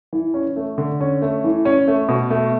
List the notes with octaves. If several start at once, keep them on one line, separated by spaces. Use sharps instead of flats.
E3
C#4
A3
D3
C#4
A3
E3
C#4
A3
B2
A3